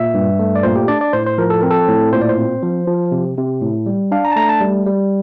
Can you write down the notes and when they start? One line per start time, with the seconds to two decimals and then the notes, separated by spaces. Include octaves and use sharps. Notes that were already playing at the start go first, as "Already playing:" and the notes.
Already playing: A#2 E5
0.14 G2
0.39 A3
0.55 D5
0.63 A#2 C5
0.76 G4
0.88 D4 D5
1.01 D5
1.13 A2 C5
1.27 C5
1.38 F3 A#4
1.50 A4
1.61 C4 A#4
1.71 A4
1.88 A2
2.12 A#2 C5
2.21 D5
2.29 C5
2.38 C4
2.63 F3
2.87 F3
3.12 C3
3.38 C3
3.61 A2
3.86 G3
4.12 D4 F5
4.25 A#5
4.32 A5
4.36 A3 A#5
4.49 A5
4.61 G3
4.86 G3